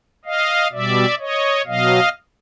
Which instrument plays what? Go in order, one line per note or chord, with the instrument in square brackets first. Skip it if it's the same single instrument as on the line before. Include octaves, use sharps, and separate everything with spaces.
[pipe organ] D#5 F5
B2 G3 D5 E5
C#5 D#5
B2 F#3 D#5 F5